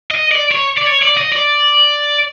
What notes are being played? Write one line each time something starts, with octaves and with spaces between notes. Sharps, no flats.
D#5
D5
C#5
D5
C#5
D5
D#5
D5